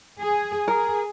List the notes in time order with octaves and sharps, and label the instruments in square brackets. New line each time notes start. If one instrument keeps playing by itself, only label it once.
[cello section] G#4
[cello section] G#4 [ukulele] A#4